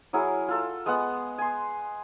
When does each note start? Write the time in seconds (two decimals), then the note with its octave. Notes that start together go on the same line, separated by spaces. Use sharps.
0.13 F#3 E4 G#4 A#4
0.48 F4 A4
0.86 G#3 B3 F#5
1.38 G#5 C6